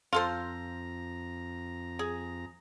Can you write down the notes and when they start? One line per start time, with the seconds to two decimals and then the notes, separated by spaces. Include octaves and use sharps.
0.13 F2 F4 A4 C5 A#5
1.99 G#4